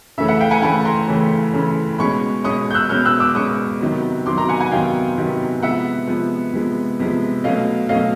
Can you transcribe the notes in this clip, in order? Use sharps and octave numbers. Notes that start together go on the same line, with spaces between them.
C#3 E3 A3 C#4 E5
E5 F#5
F5 G5
F#5 G#5
C#3 E3 A3 C#4 A5 B5
A#5 C6
C#3 E3 A3 C#4
C#3 E3 A3 C#4
B2 G#3 C#4 B5 C#6
B2 G#3 C#4 C#6 D#6
G6
E6 F#6
B2 G#3 C#4 F6 G6
E6 F#6
D6 E6
B2 G#3 C#4 C#6 D#6
C3 D#3 F#3 B3
C3 D#3 F#3 B3 C6 D6
A#5 C6
F#5 G#5
F#5 G#5
C3 D#3 F#3 B3 F5 G5
C3 D#3 F#3 B3
C3 F3 G#3 B3 E5 F#5
C3 F3 G#3 B3
C3 F3 G#3 B3
C3 F3 G#3 B3
B2 F#3 A3 C#4 D#5 F5
B2 F#3 A3 C#4 D#5 F5